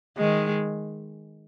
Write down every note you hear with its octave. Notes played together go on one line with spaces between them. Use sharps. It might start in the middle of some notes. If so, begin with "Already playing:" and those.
D#3 G#3